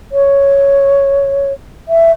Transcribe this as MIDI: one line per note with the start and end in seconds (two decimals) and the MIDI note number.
0.12 1.53 73
1.88 2.12 76